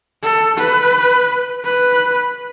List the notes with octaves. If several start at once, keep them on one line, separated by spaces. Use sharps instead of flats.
A4
B4
B4